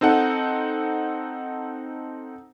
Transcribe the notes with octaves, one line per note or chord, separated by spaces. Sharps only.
C4 D#4 A4 F#5